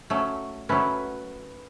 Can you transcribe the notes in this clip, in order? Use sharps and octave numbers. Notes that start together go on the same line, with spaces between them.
F#3 A3 C#4
F#3 A3 C#4 B4